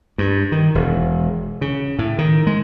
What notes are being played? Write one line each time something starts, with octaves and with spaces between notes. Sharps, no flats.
G2
D#3
E1
C#3
A2
D#3
G#3